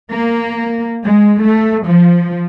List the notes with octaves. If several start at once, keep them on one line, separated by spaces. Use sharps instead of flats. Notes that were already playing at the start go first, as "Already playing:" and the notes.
A#3
G#3
A3
F3